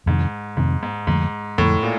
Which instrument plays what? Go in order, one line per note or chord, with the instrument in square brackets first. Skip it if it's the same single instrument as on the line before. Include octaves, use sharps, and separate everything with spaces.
[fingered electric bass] F2 C3 D#3 [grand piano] G#2
[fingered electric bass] F2 C3 D#3 [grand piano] G#2
[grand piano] G#2
[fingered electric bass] F2 D3 F3 A3 [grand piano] G#2
[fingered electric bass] F2 D3 F3 A3 [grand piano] A2
[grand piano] A#2